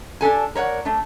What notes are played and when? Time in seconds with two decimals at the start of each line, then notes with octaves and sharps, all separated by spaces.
0.21 D4 G4 A4 G#5
0.55 A#4 C#5 D5 F#5
0.85 A3 D4